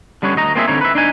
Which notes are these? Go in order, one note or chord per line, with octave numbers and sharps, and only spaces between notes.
D3 G3 B3 C#4 C#5
D2 D#5 A#5
A#3 C4 F4 G#4 D5 E5
D3 G3 C4 D#4 C#5
B4 E5
D4 D#4 G#5